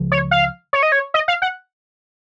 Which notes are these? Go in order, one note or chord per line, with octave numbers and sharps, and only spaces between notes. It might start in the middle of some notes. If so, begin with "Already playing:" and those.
Already playing: C#2 C#3 F3
C#5
F5
C#5
D#5
C#5
D#5
F5
F#5